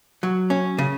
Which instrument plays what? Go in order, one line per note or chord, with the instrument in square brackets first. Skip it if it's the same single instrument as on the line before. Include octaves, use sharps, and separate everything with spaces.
[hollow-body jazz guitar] F#3
C#4
C#3